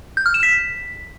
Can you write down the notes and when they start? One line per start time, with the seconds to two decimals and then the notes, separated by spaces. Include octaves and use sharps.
0.17 G6
0.26 F6
0.34 E7
0.43 B6